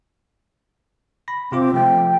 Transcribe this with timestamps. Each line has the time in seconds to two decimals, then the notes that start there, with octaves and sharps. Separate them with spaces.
1.28 B5 A#6
1.52 C3 C4 F4 D6
1.74 F3 A3 G5